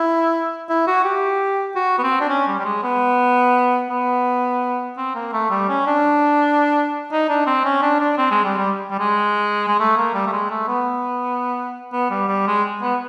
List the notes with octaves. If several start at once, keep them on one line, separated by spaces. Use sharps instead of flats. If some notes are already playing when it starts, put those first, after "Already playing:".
Already playing: E4
E4
F#4
G4
F#4
B3
C4
D4
C#4
G3
G3
G#3
B3
B3
C4
A#3
A3
G3
C#4
D4
D#4
D4
C4
C#4
D4
D4
C4
G#3
G3
G3
G3
G#3
G#3
A3
A#3
G3
A3
G#3
A3
B3
B3
G3
G3
G#3
B3